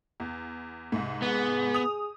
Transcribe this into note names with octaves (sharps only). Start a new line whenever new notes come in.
E2
C2 G#2
B3 G#4
D#6 F7